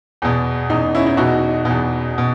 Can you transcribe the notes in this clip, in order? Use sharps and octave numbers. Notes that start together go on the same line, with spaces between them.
E2 B2
E2 B2 D#4
C#4 E4
D#4
E2 B2 D#4 F#4
E2 B2
B2